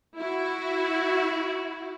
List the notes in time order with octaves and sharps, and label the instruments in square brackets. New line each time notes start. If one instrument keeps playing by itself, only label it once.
[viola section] E4 F#4